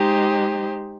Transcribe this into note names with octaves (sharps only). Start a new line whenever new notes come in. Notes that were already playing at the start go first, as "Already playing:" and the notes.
Already playing: G#3 D#4 G4 C5